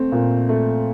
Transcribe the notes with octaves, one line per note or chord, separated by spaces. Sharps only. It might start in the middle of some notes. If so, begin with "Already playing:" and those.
Already playing: A3 C4
A#2
A3